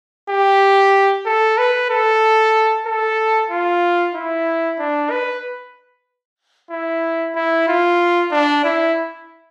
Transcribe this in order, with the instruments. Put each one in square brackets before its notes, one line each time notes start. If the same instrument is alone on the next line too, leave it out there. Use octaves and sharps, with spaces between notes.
[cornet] G4
A4
B4
A4
A4
F4
E4
D4
B4
E4
E4
F4
D4
E4